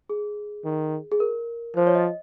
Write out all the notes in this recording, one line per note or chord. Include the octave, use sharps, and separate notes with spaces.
G#4
D#3
G#4
A#4
F3 C5
C#5
D#5